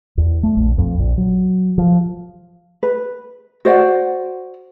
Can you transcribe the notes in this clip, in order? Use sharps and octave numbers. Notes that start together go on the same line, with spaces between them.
E2
A3
A#1
F2
A#1
F#3
F3
B4
F#4 C5 D5 F#5